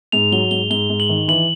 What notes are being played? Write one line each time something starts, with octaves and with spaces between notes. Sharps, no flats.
G#2 F7
F#3 G7
G#2 G7
G#2 G7
G#2
F#7
D#3
E3 F#7